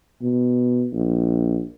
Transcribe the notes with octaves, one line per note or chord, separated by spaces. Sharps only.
B2
A#1